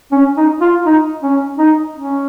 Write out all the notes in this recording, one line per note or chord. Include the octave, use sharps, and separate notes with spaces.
C#4
D#4
F4
D#4
C#4
D#4
C#4